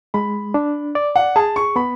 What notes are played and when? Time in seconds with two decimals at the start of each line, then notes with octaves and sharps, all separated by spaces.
0.14 G#3 B5
0.54 D4
0.95 D5
1.16 F#5
1.36 G#4 A5
1.56 C#6
1.76 B3 B5